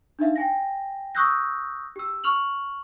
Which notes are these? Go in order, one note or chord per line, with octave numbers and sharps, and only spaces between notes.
D4 D#4 E5 F5
G5 G#5 A#6
C#6 D#6 E6 F#6 G6 A#6
G4 E6
C#6 F6 F7 F#7